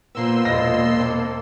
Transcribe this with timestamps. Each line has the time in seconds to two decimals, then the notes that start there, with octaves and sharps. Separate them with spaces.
0.15 A#2 F3 A#3 B3 C6 E6
0.45 E1 D#5 A#6
0.99 A#3 C4 A4